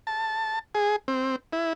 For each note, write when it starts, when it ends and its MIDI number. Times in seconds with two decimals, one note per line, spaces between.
0.07 0.59 81
0.75 0.96 68
1.08 1.36 60
1.53 1.73 64